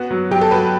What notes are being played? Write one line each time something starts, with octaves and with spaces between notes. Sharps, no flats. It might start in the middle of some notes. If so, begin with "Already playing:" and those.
Already playing: B3 F#4
F#3
F#3 G4
A4
F#3 B4